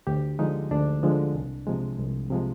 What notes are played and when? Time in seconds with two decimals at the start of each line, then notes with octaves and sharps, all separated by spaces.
0.07 D2 G4
0.39 D3 F3 G#3 D#4
0.71 D2 D4
1.03 D3 F3 G#3
1.35 C2
1.67 C3 F3 G#3
1.99 C2
2.30 C3 F3 G#3